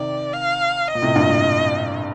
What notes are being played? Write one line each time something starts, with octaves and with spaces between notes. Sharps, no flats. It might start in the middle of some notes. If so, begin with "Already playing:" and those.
Already playing: C3 D#3 D5
F5
D#5
A#2
A2 C3
G2 A#2
A2